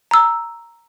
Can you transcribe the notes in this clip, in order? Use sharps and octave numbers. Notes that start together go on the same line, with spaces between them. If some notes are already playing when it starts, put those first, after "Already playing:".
A#5 E6